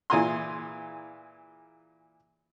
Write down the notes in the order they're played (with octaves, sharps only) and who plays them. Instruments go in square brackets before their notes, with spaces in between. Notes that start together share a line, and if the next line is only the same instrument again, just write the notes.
[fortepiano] A#2 E3 G#4 G#5 A#5 C6